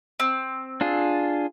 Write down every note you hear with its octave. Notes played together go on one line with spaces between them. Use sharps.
C4
D4 F4 G#4